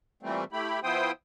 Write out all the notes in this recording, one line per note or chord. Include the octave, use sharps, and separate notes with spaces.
A#2 E3 G3 A3 C4
A3 E4 G4 B5
F3 B3 E4 C5 G5 D#6